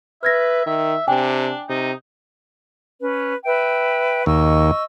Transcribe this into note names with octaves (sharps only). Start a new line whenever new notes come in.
B4 E5 F6 G#6 A#6
D#3 E5
C3 D4 G5 G#5
C3 D#4
C#4 B4
B4 E5 G5
D#2 D#5 C#6 E6